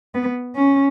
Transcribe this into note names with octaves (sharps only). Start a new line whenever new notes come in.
B3
C#4